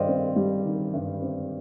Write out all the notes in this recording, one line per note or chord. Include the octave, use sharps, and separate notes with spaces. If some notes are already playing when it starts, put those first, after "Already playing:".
Already playing: G2 D#3 C5 D5 D#5 F5 G5
C4
G3
D#3
G2
C4